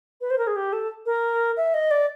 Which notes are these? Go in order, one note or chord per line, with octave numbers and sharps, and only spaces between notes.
B4
C5
A#4
G#4
G4
A4
A#4
E5
D#5
D5